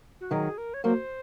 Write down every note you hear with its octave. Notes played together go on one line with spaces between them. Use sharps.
F#4
D#3 F#3 G#4
A#4
C#5
F#3 A#3 C5